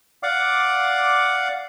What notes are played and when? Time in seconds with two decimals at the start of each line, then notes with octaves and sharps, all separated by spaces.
0.23 D5 F5 F#5 D6